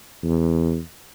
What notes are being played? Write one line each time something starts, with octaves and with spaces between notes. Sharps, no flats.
E2